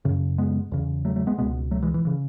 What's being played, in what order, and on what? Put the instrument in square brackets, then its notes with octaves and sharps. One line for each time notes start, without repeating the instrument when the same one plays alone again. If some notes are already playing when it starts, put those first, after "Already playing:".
[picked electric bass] F#2 C#3
G#3 B3
E2 C#3
F#3 A3
F#3 A3
G#3 B3
C#2 B2 G#3 B3
F#3 A3
E3 G#3
E3
C#3 E3